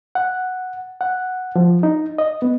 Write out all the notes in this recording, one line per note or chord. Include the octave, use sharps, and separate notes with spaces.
F#5
F#5
F3
D#4
D#5
B3